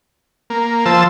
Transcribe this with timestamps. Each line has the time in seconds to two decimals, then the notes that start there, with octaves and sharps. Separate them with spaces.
0.50 A#3
0.86 F3 C5 A5 E6